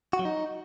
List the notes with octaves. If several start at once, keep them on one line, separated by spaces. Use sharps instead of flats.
F#4
F#3
D#4